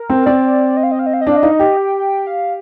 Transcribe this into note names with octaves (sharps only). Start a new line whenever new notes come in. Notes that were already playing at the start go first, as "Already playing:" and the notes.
Already playing: A#4
C4
C4 D5
D#5
F5
D#5
F5
D#5
F5
D#5
D4 F5
D#5
D#4 F5
D#5
G4
G5
F5